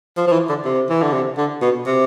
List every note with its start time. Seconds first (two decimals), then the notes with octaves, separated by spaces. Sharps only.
0.17 F3
0.27 F3
0.32 E3
0.49 D3
0.64 C3
0.90 E3
1.02 D3
1.13 C3
1.37 D3
1.62 B2
1.86 C3